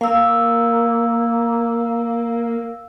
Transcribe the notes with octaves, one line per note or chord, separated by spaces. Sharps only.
A#3 F5 E6